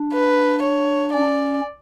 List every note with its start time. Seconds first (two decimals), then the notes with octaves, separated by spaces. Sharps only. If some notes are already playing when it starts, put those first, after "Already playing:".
Already playing: D4
0.13 B4
0.63 C#5
1.13 C#4 D5